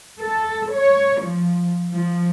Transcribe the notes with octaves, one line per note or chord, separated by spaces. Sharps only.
A4
C#5
F3
F3